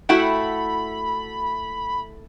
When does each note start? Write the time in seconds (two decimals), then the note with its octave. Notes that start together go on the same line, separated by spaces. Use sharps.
0.09 A3 E4 F#4 F#5 G5 B5